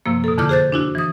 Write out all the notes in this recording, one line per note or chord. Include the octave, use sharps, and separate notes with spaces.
F#2 C3 F3 A#3
B2 A4
F2 D3 E4 D6 F6 G6
G#4 C5 F#6 G6 A6
D4 E4 F#4
E3 D#6